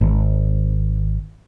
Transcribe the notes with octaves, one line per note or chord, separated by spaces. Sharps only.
G#1